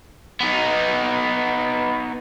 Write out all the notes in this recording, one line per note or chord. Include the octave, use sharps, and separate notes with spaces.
B3 D#4